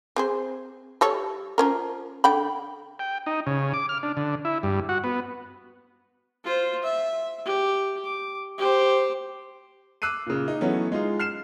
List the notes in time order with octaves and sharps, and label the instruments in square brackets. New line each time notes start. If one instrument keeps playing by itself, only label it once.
[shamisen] C4 G#4 C5
G3 A4 C#5
F3 C#4 A#4
D3 G5 B5
[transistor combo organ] G5
D#4
C#3
D6
F6
D4
D3
E4
G2
F#4
B3
[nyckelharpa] F4 C5
E5
G4
D6
G4 C5
[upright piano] D6 E6 F#6 C7 D#7
A#2 C#3
D#4
E3 F#3 A3 B3 C#4
G#3 D#4 F4
F6 C7 E7